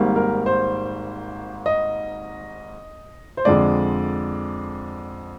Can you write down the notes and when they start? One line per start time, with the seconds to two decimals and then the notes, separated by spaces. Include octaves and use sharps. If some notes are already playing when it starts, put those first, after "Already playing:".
Already playing: G#1 G#2 G3 A#3
0.16 A#4
0.46 C5
1.66 D#5
3.37 C5
3.45 F2 D3 G#3 D5